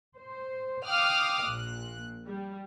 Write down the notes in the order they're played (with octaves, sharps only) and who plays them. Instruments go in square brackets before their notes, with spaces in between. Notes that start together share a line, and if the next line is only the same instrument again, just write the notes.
[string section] C5
F5 G5 D6 D#6 F6 F#6
A#1 A#2 F#6
G3